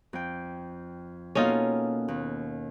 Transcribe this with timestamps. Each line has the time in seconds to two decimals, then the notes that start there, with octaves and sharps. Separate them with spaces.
0.13 F2 G5
1.35 B2 A#3 C#4 D#4 F4 A4
2.08 D#2 B3